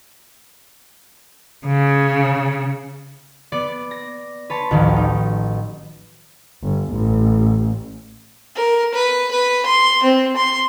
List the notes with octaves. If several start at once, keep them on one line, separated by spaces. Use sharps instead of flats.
C#3
B3 D5 A6
A#6
B4 C#5 A5 C6
A1 D2 D3 D#3 F3 F#3
D#4
G1
A1
A#4
B4
B4
C6
C4
C6